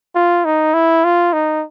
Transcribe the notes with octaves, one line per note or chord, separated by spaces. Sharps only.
F4
D#4
E4
F4
D#4